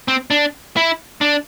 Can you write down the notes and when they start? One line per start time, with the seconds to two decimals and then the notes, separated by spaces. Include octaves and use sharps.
0.08 C4
0.31 D4
0.76 E4
1.21 D4